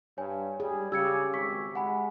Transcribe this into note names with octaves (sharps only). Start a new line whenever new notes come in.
G2 C#5 G#5
G3 G#4
C#3 G4 E6 G#6 C#7
G#1 C#6 E6 B6
G#3 F#5 G#5 B5